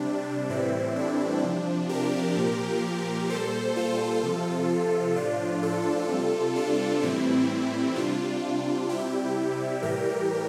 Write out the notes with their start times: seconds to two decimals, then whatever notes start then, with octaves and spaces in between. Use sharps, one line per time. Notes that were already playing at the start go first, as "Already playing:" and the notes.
Already playing: C3 G3 D4
0.50 A2 E3 G3 C4 E4
0.96 D4
1.44 C3 F3
1.89 G4 A#4
2.37 A#2 F3
3.29 A#2 G3 A4 C5
3.77 F4 A4
4.23 C3 F3
5.16 A2 F3 D4 F4
5.63 F4 A4
6.09 C3 G3
6.55 D4 F4
7.02 A2 E3 G3 C4 E4
7.96 C3 G3 D4 F4
8.89 C3 G3 E4 G4
9.82 A2 E3 G3 G4 A#4